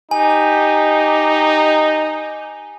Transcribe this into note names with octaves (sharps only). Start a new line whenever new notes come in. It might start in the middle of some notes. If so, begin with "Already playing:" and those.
D#4 G4 G#5